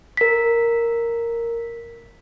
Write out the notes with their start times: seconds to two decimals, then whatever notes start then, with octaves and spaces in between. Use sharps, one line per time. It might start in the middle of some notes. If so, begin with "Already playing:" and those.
0.17 A#4 B6